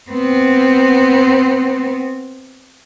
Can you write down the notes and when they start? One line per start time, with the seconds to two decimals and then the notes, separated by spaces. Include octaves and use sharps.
0.11 B3 C4